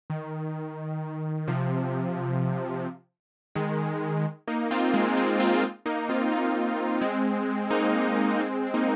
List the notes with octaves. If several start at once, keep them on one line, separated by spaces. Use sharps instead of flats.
D#3
C3 F3
D#3 G#3
A#3 D#4
C4 F4
G#3 C4
G#3 C4
C4 F4
A#3 D#4
C4 F4
A#3 D#4
G#3 C4
A#3 D#4
G#3 C4
C4
A#3 D#4